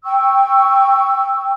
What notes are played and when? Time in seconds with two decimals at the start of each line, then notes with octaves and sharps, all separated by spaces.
0.05 G5 C#6 E6